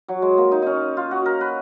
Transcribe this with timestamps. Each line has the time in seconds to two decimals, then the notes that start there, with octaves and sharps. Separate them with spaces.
0.08 F#3
0.22 G#3
0.38 A#3
0.52 D#4
0.62 C#4 D#4
0.97 F4
1.11 F#4
1.26 A#4
1.41 B4